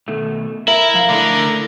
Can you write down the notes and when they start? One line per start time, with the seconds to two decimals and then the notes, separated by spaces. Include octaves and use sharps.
0.08 B2 D#3 A3
0.68 E4 A#4 E5
0.94 F#2 F3 F5
1.10 D3 A3 D#4 E4